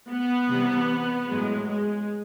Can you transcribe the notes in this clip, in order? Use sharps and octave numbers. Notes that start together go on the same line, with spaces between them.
B3
C3 E3 G3
A2 F#3 G#3
G#3